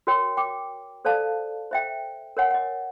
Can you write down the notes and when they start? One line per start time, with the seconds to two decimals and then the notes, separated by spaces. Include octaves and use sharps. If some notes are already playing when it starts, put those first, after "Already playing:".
0.07 F#4 A#4 C#5 G5
0.37 G5 D6
1.05 A4 C5 D5 F5 A5
1.71 C5 E5 G5
2.37 A#4 C#5 F#5 G#5
2.51 D#5 F#5